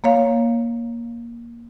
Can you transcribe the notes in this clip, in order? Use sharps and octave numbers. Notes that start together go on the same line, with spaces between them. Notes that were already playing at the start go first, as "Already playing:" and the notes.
A#3 C#5 F5